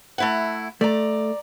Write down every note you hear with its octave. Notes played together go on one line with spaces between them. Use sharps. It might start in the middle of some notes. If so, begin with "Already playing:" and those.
A3 E4 F#5
A3 D5 A#5